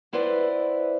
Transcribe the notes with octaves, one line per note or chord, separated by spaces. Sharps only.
B3 E4 B4 C5 D5 E5